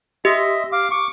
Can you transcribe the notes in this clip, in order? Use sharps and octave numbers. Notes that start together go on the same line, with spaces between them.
G4 D#5 E5
F5 D6
C#6 D6